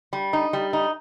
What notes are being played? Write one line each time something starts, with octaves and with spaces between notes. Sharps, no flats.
G3
D#4
G3
D#4